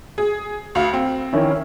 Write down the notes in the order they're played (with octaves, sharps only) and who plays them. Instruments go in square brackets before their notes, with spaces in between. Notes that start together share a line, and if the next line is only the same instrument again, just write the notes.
[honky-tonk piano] G#4
D2 F5
C4
[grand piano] D#3 C#4 E4